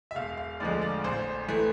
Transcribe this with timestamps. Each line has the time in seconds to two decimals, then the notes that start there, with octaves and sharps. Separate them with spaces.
0.11 E5
0.15 E1 F5
0.37 F5
0.60 D2 D3 F3 G#3 D5
0.82 D5
1.04 A1 C5
1.48 E3 A3